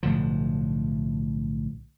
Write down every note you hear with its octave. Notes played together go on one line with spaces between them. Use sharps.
B1 A2 D3 F3